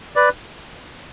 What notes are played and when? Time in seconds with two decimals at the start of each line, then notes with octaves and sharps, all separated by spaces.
0.16 B4 D5